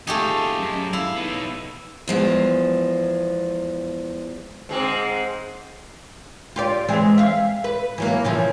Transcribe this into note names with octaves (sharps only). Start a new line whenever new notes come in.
A3 D#4 F4 G4 G#4
F#2
E4 F5
B3 D#4
E2 F3 G#3
G#2 G#3 C4
F4 G4 D5
E3 G#3 C4
E5 F5
B4
E3 F#3 A#3
C#3 E3 F3